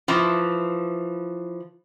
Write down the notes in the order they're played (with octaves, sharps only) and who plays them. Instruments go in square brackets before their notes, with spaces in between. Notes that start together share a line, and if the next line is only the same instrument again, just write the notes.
[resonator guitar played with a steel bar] E3 F3